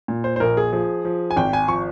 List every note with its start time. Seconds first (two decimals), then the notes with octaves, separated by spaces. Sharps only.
0.08 A#2
0.24 C5
0.36 C5
0.40 A#1 A#4
0.57 G#4
0.73 F3 G#4
1.05 F3
1.31 G#5
1.37 G#1 G5
1.53 G#5
1.68 F3 C#6